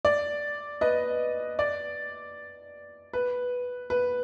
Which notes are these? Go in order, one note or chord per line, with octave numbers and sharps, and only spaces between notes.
D5
B4 D#5
D5
B4
B4